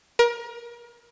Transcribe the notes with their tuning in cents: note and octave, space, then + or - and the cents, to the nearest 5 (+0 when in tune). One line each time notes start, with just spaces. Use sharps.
A#4 +30